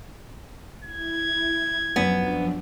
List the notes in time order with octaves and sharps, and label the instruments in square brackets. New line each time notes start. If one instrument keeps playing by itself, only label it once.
[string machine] E4 [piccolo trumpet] G#6
[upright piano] F#2 [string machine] F3 F#3 D4 [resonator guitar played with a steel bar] B3